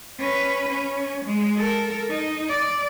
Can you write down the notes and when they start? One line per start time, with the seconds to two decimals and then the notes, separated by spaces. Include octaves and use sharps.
0.19 C#4 B4
0.69 C#4
1.25 G#3
1.57 A4 A#4
2.10 D#4
2.49 D5